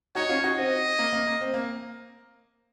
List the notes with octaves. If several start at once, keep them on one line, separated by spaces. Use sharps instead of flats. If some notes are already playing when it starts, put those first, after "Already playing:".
D#4 F#4 C#5
C#4 F4
D#4 F#4
C4 D#5
A#3
A#3
A#3
C4
A#3